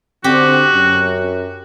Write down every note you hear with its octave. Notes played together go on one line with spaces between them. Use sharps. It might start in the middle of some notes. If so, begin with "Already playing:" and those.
D3 C4 F#4 G4
F#2